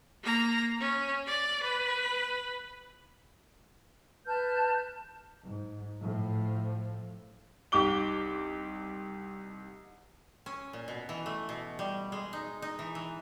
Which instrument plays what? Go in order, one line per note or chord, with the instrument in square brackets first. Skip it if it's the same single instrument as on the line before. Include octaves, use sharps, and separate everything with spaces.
[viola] A#3 A#5
C#4
D5
B4
[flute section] B4 A5 F6 G6
[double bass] G#2
A2 F3
[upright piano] C2 D#4 G4 D6 G7
[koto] C#4
A#2
B2
E3
A3
B2
G3
G#3
D#4
D#4
E3
E3